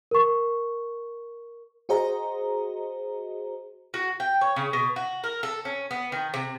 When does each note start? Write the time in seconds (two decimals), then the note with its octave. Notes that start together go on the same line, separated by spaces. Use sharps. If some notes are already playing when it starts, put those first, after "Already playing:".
0.11 A#4 C#6
1.89 F#4 G#4 C5 D#5 A#5
3.94 F#4
4.20 G5
4.41 C#5
4.56 C#3
4.73 B2
4.96 F#4
5.24 A#4
5.43 A4
5.65 C#4
5.91 B3
6.12 D#3
6.34 C3